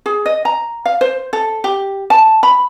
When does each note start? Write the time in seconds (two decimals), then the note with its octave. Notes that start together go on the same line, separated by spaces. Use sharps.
0.06 G#4
0.26 D#5
0.45 A#5
0.85 F5
1.01 C5
1.33 A4
1.64 G4
2.10 A5
2.43 B5